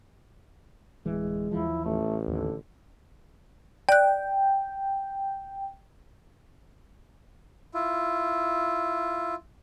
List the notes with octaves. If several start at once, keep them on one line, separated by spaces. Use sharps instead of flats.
D1 E3 G#3
D#2 E3 F3 E4
A1 A3
D#2 D3 E3
D5 G5 F#6
E4 F4